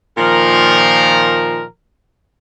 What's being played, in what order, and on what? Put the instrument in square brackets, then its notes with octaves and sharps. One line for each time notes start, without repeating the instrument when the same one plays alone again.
[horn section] A#2 D#3 F3 A#4